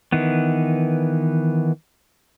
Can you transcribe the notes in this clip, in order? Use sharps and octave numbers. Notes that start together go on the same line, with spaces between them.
D#3 E3 B3